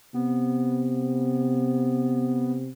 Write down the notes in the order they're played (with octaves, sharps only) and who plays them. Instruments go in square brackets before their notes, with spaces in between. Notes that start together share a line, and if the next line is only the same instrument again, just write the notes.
[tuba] C3 [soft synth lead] B3